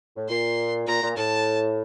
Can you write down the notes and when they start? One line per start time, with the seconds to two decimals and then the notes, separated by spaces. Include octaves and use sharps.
0.16 A2
0.29 A#2 C6
0.87 A#2 A#5
1.02 A#2
1.16 A2 A5